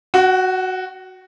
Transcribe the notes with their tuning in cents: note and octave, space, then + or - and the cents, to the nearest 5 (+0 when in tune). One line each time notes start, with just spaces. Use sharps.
F#4 +0 F#5 +45